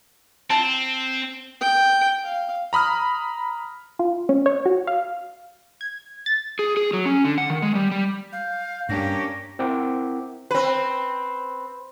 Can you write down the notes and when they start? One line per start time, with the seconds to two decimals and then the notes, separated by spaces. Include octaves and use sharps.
0.50 C4 A5
1.61 G5
2.24 F5
2.73 A#5 B5 D#6 F6
3.99 F4
4.29 C#4
4.46 C#5
4.66 F#4
4.87 F5
5.81 G#6
6.26 A6
6.59 G#4
6.77 G#4
6.93 F#3
7.06 C#4
7.24 D3
7.38 F#5
7.50 D#3
7.62 G#3
7.75 G3
7.91 G3
8.32 F5 G6
8.89 G2 A#3 C#4 D4 G4 A#6
9.59 C4 E4 A#4 F#5 G5 D6
10.51 C4 B4